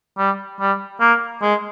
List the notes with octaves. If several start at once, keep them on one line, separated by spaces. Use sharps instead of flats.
G3
G3
A#3
G#3